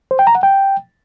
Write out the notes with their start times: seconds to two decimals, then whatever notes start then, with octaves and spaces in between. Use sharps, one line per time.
0.11 C5
0.19 G5
0.27 A#5
0.35 F#5
0.43 G5